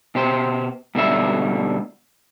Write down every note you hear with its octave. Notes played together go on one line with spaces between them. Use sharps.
B2 G4 C5
G#2 B2 D3 G3 E5